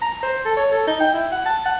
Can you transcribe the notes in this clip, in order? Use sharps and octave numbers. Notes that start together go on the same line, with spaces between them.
A#5
C5
A4
C#5
A4
D#4
G5
E4
F#5
A5
F#5